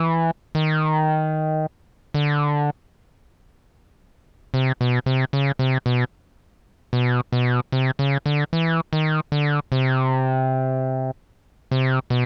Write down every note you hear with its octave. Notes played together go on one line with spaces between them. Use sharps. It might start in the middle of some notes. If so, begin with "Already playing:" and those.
Already playing: E3
D#3
D3
C3
B2
C3
C#3
C3
B2
B2
B2
C3
C#3
D3
E3
D#3
D3
C3
C3
B2